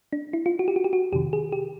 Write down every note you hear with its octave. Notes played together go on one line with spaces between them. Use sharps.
D4
E4
F4
F#4
G4
F#4
G4
F#4
F2 C3 D#3 G4
G#4
G4